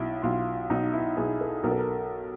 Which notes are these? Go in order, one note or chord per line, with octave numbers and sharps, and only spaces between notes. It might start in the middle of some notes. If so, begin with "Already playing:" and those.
Already playing: B1 E4
B1 F4
B1 D#4
E4
B1 G#4
A4
B1 A#4
A4
A#4